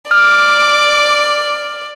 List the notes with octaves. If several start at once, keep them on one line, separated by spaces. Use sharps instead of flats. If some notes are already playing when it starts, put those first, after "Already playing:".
D5 D6 F6